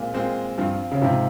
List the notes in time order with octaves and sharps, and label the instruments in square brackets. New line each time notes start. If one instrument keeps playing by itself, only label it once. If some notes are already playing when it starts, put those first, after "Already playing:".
Already playing: [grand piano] A#2 G#3 C4 F4
A#2 G#3 C4 F4
[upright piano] G2 [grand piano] F3 C4 F4
[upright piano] C#3
[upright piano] G#2 C3 [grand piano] F3 C4 F4